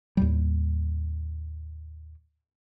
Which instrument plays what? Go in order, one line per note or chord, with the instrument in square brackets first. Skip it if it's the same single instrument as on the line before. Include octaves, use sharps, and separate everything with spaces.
[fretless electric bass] D#2 A2 G3